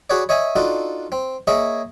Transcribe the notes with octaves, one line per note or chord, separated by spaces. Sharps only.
F#4 G#4 B4 C#5 D5
C#5 D#5 E5 G#5
D4 D#4 F4 F#4 A4
C4
A#3 G#4 C#5 D#5 E5